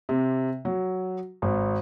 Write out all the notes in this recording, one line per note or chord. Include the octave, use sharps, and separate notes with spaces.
C3
F#3
G#1